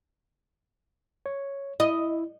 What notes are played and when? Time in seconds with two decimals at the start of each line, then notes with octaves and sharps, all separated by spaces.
1.26 C#5
1.80 E4 D#5